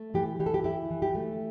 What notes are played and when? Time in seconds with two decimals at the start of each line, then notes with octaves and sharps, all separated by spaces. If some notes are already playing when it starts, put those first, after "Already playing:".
Already playing: A3
0.14 E3 G4
0.40 E3 G4
0.46 A4
0.54 G4
0.64 E4 G4
0.90 E3
1.02 G4
1.15 A3